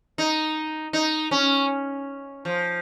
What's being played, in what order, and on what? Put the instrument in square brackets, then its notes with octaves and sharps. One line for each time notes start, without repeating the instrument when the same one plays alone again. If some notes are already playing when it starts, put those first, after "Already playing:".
[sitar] D#4
D#4
C#4
F3